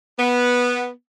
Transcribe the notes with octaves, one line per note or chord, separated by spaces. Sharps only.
B3